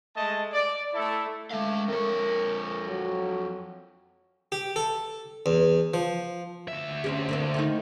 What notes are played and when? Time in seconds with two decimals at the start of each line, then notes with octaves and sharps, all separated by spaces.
0.17 G#3 A3 D#5 A5
0.53 D5
0.94 A3 E4 A4
1.51 G#3 A3 F5
1.88 F2 A#4 C#5
2.88 F#3
4.52 G4
4.76 A4
5.46 E2
5.94 F3
6.68 D2 E5
7.04 C4 C#4 G4
7.29 D3 A#3 C4
7.54 D#3 A3 D#4